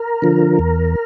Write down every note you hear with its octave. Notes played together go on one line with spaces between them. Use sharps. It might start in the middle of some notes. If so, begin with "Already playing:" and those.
Already playing: A#4
D3 F3
E2